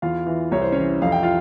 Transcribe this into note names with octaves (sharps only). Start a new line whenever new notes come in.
E2 F4 F5
E3
C2 C#5
C5
C#4 C#5
E3
F2 F5
G5
F4 F5